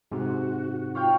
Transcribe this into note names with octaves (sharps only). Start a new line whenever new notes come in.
G#2 C3 F#4
F4 C#5 F5 G5